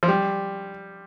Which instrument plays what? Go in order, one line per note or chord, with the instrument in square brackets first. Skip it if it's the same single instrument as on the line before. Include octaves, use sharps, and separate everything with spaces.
[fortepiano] F3
G3